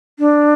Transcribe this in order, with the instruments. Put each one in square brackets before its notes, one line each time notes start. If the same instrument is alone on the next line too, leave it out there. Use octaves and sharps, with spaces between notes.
[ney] D4